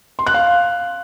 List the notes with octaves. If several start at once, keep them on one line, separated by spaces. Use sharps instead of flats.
C6
F#6
F5